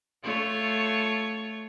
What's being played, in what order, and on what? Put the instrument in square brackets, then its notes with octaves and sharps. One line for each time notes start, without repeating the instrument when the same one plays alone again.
[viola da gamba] A3 F4 C#5